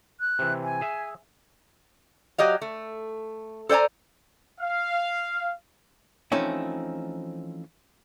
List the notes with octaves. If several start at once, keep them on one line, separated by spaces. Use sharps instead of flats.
F#6
C3 E3
G#5
G#4 E5
F#3 G4 D#5 F5
A3
A4 C5 D5 G#5 A#5
F5
E3 F3 A3 C4 C#4 D#4